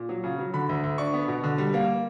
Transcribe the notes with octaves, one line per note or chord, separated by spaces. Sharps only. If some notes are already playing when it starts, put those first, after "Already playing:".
Already playing: A#2
F#3
C#3
F#3
D3 B5
D2
D2
D4 C#6
B3
B2
D3
G3
A#3